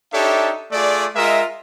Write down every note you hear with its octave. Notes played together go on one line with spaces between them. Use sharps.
D4 D#4 G4 A4 C#5 E5
A3 F4 G#4 D5
G#3 F4 A#4 D#5 E5